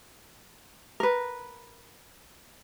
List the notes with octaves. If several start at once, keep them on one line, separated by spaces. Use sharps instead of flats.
A#4 B4